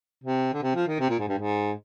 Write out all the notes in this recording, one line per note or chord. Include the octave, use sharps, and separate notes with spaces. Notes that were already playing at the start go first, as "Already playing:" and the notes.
C3
D3
C3
F3
D#3
C3
A#2
G#2
G2
G#2